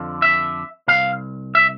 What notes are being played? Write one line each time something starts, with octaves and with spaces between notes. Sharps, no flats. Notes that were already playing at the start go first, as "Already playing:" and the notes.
Already playing: F2 D3 F3
E5
C2 B2 F5
E5